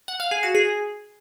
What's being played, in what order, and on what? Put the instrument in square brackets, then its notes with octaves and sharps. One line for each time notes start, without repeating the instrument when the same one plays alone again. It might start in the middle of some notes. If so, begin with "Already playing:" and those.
[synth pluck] F#5
F5
G#4
F#4
G#4